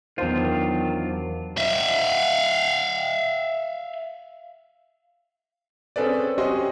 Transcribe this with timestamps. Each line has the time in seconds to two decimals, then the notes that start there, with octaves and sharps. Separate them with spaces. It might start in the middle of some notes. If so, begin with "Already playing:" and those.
0.18 E2 D#3 F#3 D4 F4 C5
1.57 E5 F5
5.96 C4 C#4 G#4 A4 B4 D5
6.38 C4 C#4 F#4 G4 D#5 C6